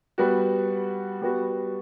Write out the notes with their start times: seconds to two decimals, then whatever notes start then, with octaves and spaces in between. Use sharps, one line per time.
0.18 G3 B3 F#4
1.22 G3 B3 F#4